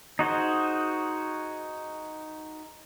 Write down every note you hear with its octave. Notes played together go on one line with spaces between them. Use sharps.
D#4 F#4 G#4 C5